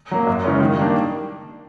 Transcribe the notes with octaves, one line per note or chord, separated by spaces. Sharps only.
F#3 A#3
F#2
C#3 E3 G#3 C#4
D#3
G3 A#3 D4